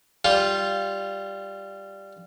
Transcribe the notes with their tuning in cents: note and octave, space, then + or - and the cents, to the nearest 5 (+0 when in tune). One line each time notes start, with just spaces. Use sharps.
G3 +0 F4 +0